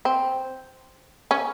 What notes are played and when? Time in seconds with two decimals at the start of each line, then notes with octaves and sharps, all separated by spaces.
0.05 C4
1.31 C#4